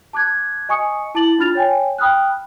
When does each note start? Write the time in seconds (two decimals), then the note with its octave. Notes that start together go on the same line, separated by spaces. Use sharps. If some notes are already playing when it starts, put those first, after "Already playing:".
0.13 A5 D6 F#6 G#6
0.69 D#5 G#5 C#6 D#6 C#7
1.15 E4 A5 D6 A6 F#7
1.39 D4 F4 B5 F6 A6 F7
1.55 C#5 G5 G#5
1.98 G5 B5 D#6 F6 F#6